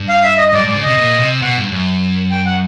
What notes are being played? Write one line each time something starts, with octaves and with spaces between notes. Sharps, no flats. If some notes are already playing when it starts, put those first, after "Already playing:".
Already playing: G2
F5
E5
D#5
D#5
G2 D5
G#2 D5
C#3
C3 D#5
A#2
C3
B2 F#5
G2
F#2
G5
F#5